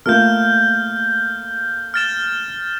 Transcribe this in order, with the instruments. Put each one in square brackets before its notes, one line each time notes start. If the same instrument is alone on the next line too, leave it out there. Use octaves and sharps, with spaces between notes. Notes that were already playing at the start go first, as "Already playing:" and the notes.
[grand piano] A3 A#3 F4 [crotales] F6 G6
[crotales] F6 A6 E7